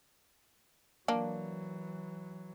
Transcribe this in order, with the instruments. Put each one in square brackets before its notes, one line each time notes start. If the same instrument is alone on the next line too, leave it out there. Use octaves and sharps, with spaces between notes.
[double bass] E3 F#3 [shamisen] A#3 D4